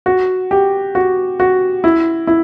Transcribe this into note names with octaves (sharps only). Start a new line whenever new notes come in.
F#4
G4
F#4
F#4
E4
E4